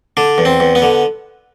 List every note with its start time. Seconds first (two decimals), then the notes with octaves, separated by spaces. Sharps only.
0.17 D3 D4
0.38 E2
0.45 C4
0.60 E2
0.75 B3
0.82 D3